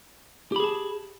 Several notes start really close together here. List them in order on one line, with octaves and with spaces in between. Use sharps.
G4 B5 G#4 A5